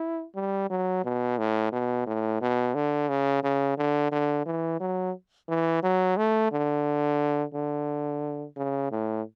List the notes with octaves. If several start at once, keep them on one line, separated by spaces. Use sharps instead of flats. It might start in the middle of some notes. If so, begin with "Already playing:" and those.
Already playing: E4
G3
F#3
B2
A2
B2
A2
B2
D3
C#3
C#3
D3
D3
E3
F#3
E3
F#3
A3
D3
D3
C#3
A2